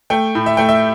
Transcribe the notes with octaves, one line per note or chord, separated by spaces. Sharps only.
A3 G5
A2
E5
A3 G5
E5